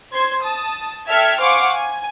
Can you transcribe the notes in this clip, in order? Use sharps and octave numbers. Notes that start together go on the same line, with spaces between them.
C5 C6 G#6
A5 D#6
A4 E5 G5 E6 F6 G#6
C5 F5 F#5 G#5 C#6 D6
G#5